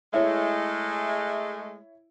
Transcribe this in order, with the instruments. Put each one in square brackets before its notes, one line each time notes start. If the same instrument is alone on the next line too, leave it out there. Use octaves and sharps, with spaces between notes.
[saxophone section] G#3 A3 [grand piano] E4 C#5 E5